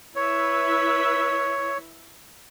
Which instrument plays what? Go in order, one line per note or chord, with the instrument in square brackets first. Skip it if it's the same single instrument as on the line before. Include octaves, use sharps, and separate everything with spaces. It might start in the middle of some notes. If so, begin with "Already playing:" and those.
[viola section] E4 B4 E5 [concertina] C#5